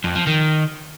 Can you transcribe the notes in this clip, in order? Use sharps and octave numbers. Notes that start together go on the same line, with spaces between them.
F2
F3
D#3